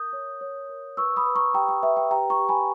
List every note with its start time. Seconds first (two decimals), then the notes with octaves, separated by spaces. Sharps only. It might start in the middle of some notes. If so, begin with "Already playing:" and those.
Already playing: A#4 D#6 G6
0.13 C#5
0.41 C#5
0.69 A#4
0.97 B4 C#6 E6
1.17 B5 D#6
1.26 B4
1.35 A#5 C#6
1.54 G4 G5 A#5
1.68 G5
1.83 B4 E5
1.97 G5
2.11 G4 G5 A#5
2.30 A#5 C#6
2.39 G4
2.49 G#5 B5